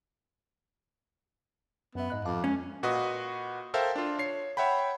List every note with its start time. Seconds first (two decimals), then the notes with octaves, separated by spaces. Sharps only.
1.95 F#2 B3 E5
2.10 G#2 D#5 F#6
2.25 F2 F5 A5 D6
2.44 G#3 C#4
2.83 A#2 F#4 B4 D#5 D#6
3.74 A4 A#4 C5 E5 F5 G5
3.96 D4 F4
4.19 C#5 C7
4.57 C#5 E5 F#5 G5 B5